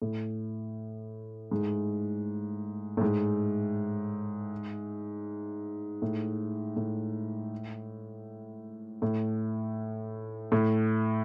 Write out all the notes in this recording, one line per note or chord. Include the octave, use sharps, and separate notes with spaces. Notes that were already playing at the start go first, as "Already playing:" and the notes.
A2
G#2
A2
G#2
A2
A2
A2
A2